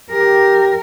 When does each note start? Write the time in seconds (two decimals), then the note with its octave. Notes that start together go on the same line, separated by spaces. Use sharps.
0.11 G4 A#4